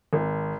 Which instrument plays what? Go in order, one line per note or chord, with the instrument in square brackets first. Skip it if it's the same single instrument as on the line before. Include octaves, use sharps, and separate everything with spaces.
[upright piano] G#1